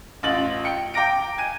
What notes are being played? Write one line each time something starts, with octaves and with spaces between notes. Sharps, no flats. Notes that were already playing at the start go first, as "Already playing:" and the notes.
A1 F4 A6 F#7
G5 C#7
G5 A#5 D6 A#6 D7
G#5 G#6 D#7